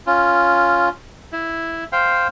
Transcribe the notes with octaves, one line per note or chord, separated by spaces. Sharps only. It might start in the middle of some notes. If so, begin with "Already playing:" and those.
C#4 F4
E4
C5 F5 G5